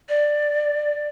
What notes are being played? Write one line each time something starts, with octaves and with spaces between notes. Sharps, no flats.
D5